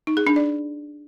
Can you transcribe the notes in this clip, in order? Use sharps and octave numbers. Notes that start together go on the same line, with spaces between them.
D#4
G#4
D4
D5